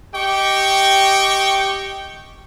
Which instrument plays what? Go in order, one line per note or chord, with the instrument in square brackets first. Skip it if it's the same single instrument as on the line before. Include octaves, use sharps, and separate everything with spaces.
[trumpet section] G4 D#5 G5 C#6